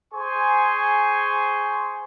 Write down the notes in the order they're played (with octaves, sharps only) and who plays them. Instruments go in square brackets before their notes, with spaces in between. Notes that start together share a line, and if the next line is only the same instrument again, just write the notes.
[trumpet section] G#4 C5 G#5 C6 C#6